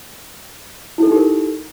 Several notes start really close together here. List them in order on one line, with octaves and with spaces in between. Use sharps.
E4 A4 D#4 G4 A#4